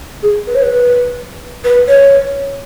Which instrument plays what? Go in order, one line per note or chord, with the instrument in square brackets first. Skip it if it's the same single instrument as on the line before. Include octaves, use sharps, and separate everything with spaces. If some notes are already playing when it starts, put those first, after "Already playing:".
[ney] G#4
B4
C#5
B4
B4
C#5